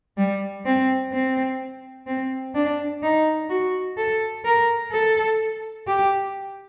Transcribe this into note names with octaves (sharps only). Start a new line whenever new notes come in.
G3
C4
C4
C4
D4
D#4
F#4
A4
A#4
A4
G4